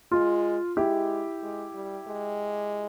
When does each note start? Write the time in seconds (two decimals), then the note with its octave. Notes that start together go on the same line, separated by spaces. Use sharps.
0.12 G#3 F4
0.77 G#3 E4 G4
1.43 G#3
1.75 G3
2.07 G#3